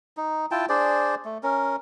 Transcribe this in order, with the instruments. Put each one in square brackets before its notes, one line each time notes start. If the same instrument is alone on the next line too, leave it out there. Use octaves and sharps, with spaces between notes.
[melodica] D#4
E4 F4 G5 A5
D4 G#4 C5 D5
A3
C#4 A#4